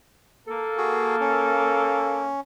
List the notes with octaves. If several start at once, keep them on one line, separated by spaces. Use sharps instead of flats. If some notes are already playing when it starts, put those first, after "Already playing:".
A#3 A4
F#4 G#4
C#4